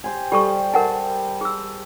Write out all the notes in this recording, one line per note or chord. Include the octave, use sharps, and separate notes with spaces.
G4 C5 G#5
G3 G4 A4 C#6
A#4 F#5 G#5 A5
G#4 E6